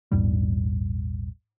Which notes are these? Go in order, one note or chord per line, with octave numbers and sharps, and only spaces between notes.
A#1 E2 G#2 G3